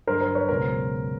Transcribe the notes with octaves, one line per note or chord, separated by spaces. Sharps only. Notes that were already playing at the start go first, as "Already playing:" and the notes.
G2 D3 F#3 A#4 C5
A#4 C5
B4 C#5
C#2 B2 F#3 A#4 C5